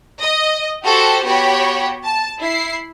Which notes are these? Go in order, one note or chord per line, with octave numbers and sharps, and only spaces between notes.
D#5
F#4 G4 A4 C5 A5
B3 F#4 G4 C#5 G5 B5
A5
E4 C7